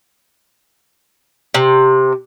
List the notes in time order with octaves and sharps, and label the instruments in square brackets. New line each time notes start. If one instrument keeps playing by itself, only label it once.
[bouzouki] C3